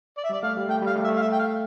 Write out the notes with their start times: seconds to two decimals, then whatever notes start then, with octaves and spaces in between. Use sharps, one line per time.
0.17 D5
0.24 E5
0.29 G3 D5
0.43 A3 F5
0.57 G3
0.69 A3 G5
0.82 G3
0.87 F5
0.95 A3
1.04 E5
1.09 A3
1.17 F5
1.22 E5
1.32 G5
1.39 F5